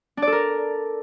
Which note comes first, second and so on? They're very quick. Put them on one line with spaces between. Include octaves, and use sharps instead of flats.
D4 D5 A4 A#4